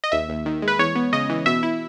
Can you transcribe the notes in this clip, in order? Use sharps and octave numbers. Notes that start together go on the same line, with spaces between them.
D#5
D#2 E5
D#2
D#3
G#3
B4
E2 C#5
B3
C#3 D#5
E3
B2 E5
E4